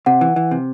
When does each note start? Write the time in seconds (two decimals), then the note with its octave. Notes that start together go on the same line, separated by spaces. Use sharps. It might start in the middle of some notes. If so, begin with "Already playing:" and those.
0.06 C3 F#5
0.21 E3
0.36 E3
0.51 C3